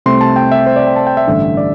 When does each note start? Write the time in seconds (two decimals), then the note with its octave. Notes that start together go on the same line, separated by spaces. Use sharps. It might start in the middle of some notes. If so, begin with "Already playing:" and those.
0.06 C2 C3 A3 C4 C6
0.21 A5
0.36 G5
0.51 E5
0.66 C5
0.76 D5
0.87 G5
0.96 A5
1.07 G5
1.17 E5
1.27 A1 G2 D3 A3
1.57 D5